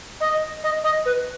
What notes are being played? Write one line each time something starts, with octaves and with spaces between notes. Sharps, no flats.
D#5
D#5
D#5
B4